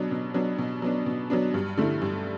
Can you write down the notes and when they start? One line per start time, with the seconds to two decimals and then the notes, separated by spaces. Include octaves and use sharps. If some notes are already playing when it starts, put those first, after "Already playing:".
Already playing: B2 F#3 B3 D4
0.11 B2
0.34 F#3 B3 D4
0.58 B2
0.82 F#3 B3 D4
1.06 B2
1.30 F#3 B3 D4
1.54 G2
1.77 D3 A3 E4
2.02 G2